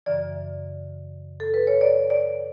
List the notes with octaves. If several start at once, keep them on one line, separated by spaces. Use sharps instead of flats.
F#2 C#3 E3 D5
A4
B4
C#5
D5
D5